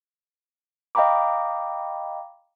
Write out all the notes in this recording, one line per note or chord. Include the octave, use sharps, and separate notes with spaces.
D#5 F5 G5 A#5 B5 D6